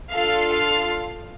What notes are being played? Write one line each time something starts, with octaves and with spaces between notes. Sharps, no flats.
D4 F4 A4 F5
F5